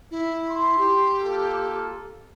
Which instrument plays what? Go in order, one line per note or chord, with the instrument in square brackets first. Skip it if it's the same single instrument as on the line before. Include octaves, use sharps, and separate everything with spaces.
[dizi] E4
[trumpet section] C6
[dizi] G4
[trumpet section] A#3 F4 A4